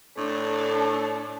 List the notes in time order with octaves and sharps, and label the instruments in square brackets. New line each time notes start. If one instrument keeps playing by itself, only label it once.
[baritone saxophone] A2 [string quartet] D4 [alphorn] A4